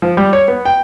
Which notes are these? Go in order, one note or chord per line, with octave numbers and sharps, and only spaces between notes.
F3
G3
C#5
B3
G5